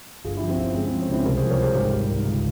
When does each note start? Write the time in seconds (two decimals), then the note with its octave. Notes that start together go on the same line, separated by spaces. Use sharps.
0.24 G1 F4 G#4
0.37 E4 G4
0.41 F3
0.49 C4 E4
0.58 G1 C#4
0.75 G#3 C4
0.87 C4
0.92 F3
0.99 C#4
1.08 C#2 C4 E4
1.25 C2 G4 A#4
1.37 G#4 C5
1.42 F3
1.50 A#4 C#5
1.58 C2 G#4 C5
1.75 G#1 G4 A#4
1.92 G3
2.09 G#1
2.25 C#2